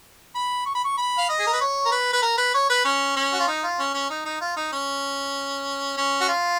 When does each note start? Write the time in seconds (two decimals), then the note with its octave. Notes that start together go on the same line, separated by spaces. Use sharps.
0.35 B5
0.66 C#6
0.75 B5
0.84 C#6
0.98 B5
1.18 F5
1.29 D#5
1.39 G#4
1.47 A#4
1.53 B4
1.61 C#5
1.85 A#4
1.92 B4
2.13 B4
2.22 A#4
2.38 B4
2.54 C#5
2.70 B4
2.85 C#4
3.16 C#4
3.33 F#4
3.40 F4
3.48 D#4
3.63 F4
3.79 C#4
3.94 C#4
4.10 D#4
4.25 D#4
4.41 F4
4.57 D#4
4.72 C#4
5.97 C#4
6.21 F#4
6.28 F4